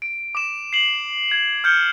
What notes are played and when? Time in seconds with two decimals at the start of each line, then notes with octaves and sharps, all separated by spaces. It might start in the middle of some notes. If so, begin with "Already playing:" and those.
0.02 D7
0.35 D6 E7
0.73 C7 F#7
1.31 G#6
1.64 F6 G6 C#7 G7